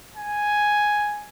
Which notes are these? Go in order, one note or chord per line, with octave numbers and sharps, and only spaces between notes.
G#5